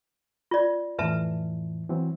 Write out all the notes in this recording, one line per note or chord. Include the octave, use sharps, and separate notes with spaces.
F4 D5
F2 A2 E3 B4 E5 A5
E3 F#3 C4